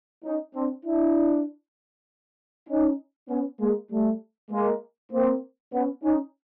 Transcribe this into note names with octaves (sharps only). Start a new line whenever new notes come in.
C#4 D#4
C4 D4
D4 E4
C#4 D#4
B3 C#4
G#3 A#3
G3 A3
G#3 A#3
A#3 C4
B3 C#4
C#4 D#4